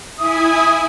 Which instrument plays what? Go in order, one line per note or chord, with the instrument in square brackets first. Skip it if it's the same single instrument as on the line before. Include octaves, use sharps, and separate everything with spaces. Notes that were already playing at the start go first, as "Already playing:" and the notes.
[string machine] E4 G#5 [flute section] E5 D#6